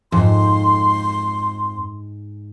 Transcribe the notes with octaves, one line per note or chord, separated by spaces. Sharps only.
F2 G#2 C6